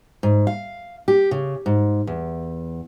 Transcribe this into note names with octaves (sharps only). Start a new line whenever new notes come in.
G#2
F5
G4
C#3
G#2
E2